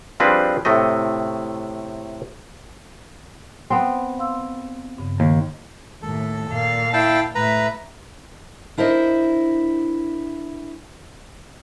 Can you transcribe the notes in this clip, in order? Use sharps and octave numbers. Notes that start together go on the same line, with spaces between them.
F3 G3 C4 D4 G#4 B4
A2 C3 A3 D#5
B3 C4
F5 C6 E6
G2 C#3
D#2
D#2 A2 A4
A#2 F5
E4 G5 A5
A2 B4 E5 A#5
D4 E4 A#4 C5 D#5